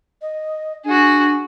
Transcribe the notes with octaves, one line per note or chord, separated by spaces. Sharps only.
D#5
D4 F#4 G#4